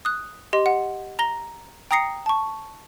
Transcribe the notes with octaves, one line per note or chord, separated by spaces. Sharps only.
D#6 F#6
G4 D#5 C6
F#5
A#5 A#6 G7
G5 A#5 D#6 A#6 C7 C#7
A5 C#6